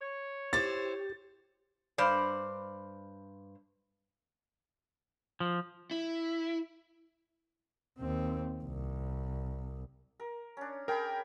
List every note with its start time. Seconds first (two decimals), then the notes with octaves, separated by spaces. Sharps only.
0.01 C#5
0.53 E4 G4 C5 A6
1.98 G2 C5 D5
5.40 F3
5.91 E4
7.99 D#2 C4
8.63 C2
10.20 A#4
10.57 C#4 D4
10.88 G#4 A#4 G5 B5